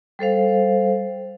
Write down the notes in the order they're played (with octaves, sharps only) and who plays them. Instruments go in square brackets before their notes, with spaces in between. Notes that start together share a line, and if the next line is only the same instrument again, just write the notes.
[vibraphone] G3 A4 C5 F5